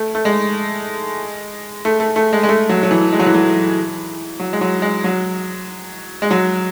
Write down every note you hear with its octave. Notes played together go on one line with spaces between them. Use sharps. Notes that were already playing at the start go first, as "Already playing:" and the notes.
Already playing: A3
A3
G#3
A3
A3
A3
G#3
G#3
A3
F#3
F#3
E3
G#3
F#3
E3
F#3
F#3
G#3
F#3
G#3
F#3
G#3
F#3